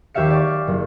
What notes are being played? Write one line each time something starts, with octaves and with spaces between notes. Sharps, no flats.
D#2 G4 C#5 E5 F5 C#7
D5 C#6
F#1